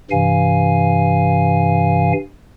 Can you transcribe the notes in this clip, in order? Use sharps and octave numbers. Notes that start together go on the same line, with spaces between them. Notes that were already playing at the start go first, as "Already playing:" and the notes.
G2 C3 E3 F5 G#5